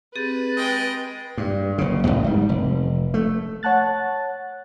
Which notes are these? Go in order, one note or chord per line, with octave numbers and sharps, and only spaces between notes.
C4 G4 G#4 B4 A6
G#3 D#5 G5
G2
F#1 C#3
E1 D#2 A2 B3
G#2 G3
F1
A3
C#5 F#5 A5 F#6 A6